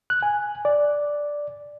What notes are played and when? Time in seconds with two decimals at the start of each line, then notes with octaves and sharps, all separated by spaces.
0.10 F#6
0.22 G#5
0.65 D5